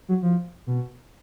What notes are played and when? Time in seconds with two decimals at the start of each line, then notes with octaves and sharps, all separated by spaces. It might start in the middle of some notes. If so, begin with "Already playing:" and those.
0.09 F#3
0.22 F3
0.67 B2